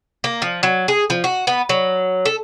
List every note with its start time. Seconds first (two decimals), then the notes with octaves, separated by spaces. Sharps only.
0.24 A#3
0.42 F3
0.63 F#3
0.88 G#4
1.10 F3
1.24 F#4
1.47 B3
1.69 F#3
2.25 A4